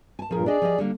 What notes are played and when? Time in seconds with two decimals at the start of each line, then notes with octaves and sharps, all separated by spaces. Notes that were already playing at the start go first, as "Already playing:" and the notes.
0.19 G#5 A5
0.31 G2 A#2 F3 G#4 A#4
0.46 D4 G#4 D5 D#5
0.62 F3 G4 D#5
0.78 D3 G3 A#3